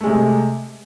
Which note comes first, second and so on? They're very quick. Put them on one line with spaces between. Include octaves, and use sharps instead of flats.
A3 G#3 C3